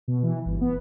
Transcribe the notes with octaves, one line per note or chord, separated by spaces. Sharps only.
B2
E3
G1
B3